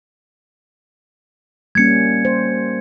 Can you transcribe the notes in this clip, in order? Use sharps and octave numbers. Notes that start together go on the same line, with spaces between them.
G3 A#3 C#4 G#6 C#7
C5